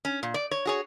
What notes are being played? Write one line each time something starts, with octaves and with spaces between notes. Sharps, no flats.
C#4
A#2
D5
C#5
F#4 G#4 C#5